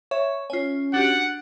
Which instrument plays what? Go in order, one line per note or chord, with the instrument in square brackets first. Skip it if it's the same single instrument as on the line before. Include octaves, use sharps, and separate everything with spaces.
[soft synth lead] C#5 [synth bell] E5
[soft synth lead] C#4 [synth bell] F4 G#5
[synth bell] D4 F#4 G4 [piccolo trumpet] F#5